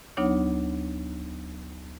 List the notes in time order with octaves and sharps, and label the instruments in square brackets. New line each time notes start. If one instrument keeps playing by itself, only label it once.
[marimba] D2 F#3 B3 D4 D#4 C#5